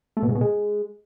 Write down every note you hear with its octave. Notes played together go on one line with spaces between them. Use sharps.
A3
B2
G#2
B2
G#3